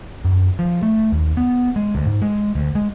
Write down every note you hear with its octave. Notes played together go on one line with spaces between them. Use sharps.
F#2
F3
A3
D#2
B3
G#3
D2
G#2
G#3
D2
G#3